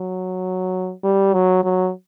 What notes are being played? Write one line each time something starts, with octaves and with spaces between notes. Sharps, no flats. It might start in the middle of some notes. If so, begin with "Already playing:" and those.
Already playing: F#3
G3
F#3
F#3